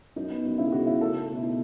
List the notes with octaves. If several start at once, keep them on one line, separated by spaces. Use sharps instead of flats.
F#2 D#4
B3
F#2
C#3 E4
G#4
C#3 F#4
C#3 E4
A3 A4
A3
A4
B2
E4
B2 D#4